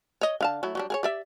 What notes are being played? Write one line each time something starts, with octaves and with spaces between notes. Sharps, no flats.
C#5 D#5
D3 F5 A5
F#3 A3 E4
F#3 G3 D4
G#4 A#4 C#5
G4 D5 E5